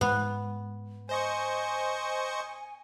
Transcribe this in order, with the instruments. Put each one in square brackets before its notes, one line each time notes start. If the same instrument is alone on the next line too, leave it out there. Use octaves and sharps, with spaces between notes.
[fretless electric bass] G#2 [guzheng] B3
[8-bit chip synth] C5 D#5 C#6 [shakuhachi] G#5